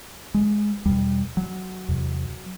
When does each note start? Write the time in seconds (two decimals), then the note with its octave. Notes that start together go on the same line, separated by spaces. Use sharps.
0.34 G#3
0.86 E2 B2 G3
1.37 F#3
1.88 E2 C3